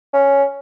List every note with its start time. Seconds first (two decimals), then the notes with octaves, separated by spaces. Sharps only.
0.13 C#4